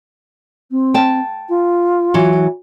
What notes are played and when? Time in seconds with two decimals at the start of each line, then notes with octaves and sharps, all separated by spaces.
0.70 C4
0.94 G5 A5
1.48 F4
2.14 E3 F#3